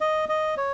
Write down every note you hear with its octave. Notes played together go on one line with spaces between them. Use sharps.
D#5
D#5
C#5